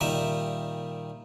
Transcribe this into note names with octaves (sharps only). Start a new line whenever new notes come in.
A#2 D#3 G3 E5